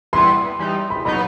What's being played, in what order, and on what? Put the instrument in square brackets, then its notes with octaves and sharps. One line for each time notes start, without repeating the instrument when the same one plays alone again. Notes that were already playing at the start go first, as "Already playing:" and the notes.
[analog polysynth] E3 G3 B3 E4 B4 [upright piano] C6
[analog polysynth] E3 G3 D#4
[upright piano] B5
[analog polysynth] B2 F#3 B3 D#4 [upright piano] B5